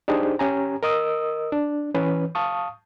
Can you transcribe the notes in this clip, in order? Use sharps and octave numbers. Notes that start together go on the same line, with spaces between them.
D4 D#4 G4 G#4 C5
C#4 G4 G#5 A#5
A#4 D#5 D#6 E6
D4
E3 C#4 B4
F5 A5 C#6 D#6